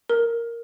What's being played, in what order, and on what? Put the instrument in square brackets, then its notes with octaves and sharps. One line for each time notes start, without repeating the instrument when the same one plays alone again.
[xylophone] A#4